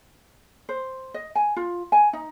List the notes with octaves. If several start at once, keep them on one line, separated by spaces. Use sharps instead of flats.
C5
D#5
G#5
F4
G#5
D#4